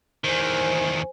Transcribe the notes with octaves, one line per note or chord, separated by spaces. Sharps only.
E2 D#3 C5 G#5